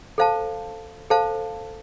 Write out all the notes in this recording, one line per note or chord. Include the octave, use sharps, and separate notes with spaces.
A4 C5 F5 A5
A4 C5 F5 A5